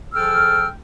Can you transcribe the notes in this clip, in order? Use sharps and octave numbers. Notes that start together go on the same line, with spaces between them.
F3 G#4 A4 G5 E6 F6